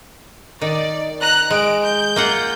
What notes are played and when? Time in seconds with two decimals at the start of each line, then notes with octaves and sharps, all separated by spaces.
0.62 D#3 D5
1.21 A#5 F#6
1.50 G#3 D7
1.83 G6
2.16 A#3 F4 F#5